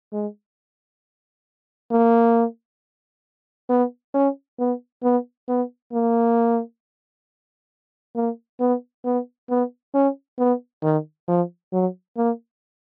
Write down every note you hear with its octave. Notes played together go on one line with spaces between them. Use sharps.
G#3
A#3
B3
C#4
B3
B3
B3
A#3
A#3
B3
B3
B3
C#4
B3
D#3
F3
F#3
A#3